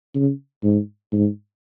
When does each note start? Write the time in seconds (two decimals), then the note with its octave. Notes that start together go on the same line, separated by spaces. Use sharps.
0.15 C#3
0.64 G#2
1.12 G#2